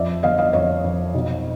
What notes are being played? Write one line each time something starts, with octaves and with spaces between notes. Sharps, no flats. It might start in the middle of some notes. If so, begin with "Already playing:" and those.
Already playing: F2 F3 D5 E5
G1 D#5 F5
D#5 F5
F2 C#5 D#5
F2
B1